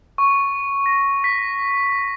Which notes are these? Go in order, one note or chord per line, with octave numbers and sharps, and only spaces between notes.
C#6
A#6
B6